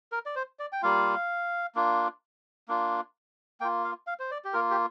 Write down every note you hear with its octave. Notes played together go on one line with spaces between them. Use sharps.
A#4
D5
C5
D5
G5
G3 A#3 F4 F5
A#3 D4 F4
A#3 D4 F4
A#3 F4 G5
F5
F5
C5
D5
G4
A#3 F4 A#4
G4